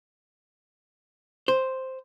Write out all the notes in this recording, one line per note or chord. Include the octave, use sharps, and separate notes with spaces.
C5